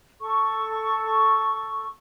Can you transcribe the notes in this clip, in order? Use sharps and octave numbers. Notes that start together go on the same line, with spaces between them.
A4 C#6